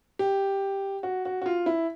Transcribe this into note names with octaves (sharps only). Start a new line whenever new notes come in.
G4
F#4
F#4
F#4
F4
E4